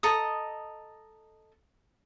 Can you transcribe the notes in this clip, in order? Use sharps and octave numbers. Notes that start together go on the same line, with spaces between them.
A4 D#5 A#5 D#6